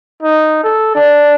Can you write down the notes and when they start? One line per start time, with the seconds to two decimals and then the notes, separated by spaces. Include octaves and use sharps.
0.22 D#4
0.63 A4
0.95 D4